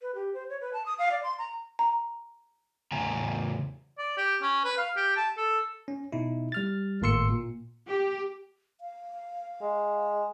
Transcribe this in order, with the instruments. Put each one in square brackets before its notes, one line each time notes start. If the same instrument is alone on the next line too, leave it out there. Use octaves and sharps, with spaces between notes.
[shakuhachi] B4
G4
C5
C#5
B4
A5
D#6
F5
D5
C6
A#5
[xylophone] A#5
[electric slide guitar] E2 A2 C#3 G#5 A#5
[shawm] D5
G4
C#4
B4
F5
G4
A5
A4
[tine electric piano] C#4
B2 D#4 E4
G3 F6 A6
G#1 A2 A#3 C6 E6 C#7
A#2
[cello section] G4
[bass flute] F5
[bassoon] G#3